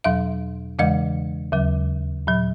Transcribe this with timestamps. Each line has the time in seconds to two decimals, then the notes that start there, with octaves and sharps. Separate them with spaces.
0.04 E2 B2 F#3 E5
0.79 E2 C#3 E3 G#3 D#5
1.52 D#2 C#3 F#3
2.27 A#2 F#3